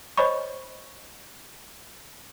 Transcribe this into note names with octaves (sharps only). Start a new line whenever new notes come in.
C5 C#5 D#5 B5 C#6